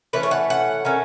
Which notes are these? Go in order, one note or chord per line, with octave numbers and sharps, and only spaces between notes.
E3 A3 C#4 B4
C#5
F#5
F#5
D#3 A3 C#4